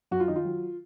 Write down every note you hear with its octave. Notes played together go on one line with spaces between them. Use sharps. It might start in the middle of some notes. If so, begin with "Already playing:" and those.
F#2 F#4
F4
D#3 D#4
F4
F#3